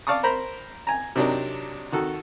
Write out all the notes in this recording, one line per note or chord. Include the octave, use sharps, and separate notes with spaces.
D5 F5 A5 C#6 D#6
A#4 C5 A#5 B5
G#5 A#5
C3 F#3 D4 D#4 A#4
D#3 F#4 A4